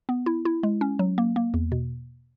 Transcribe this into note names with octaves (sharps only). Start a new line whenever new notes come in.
B3
E4
E4
G#3
C#4
F#3
A#3
A#3
E2
B2